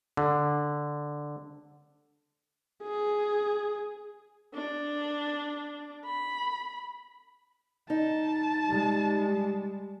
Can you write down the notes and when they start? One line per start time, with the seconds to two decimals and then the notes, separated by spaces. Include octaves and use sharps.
0.17 D3
2.84 G#4
4.54 D4
6.05 B5
7.90 D#4 A5
8.67 G3 G#3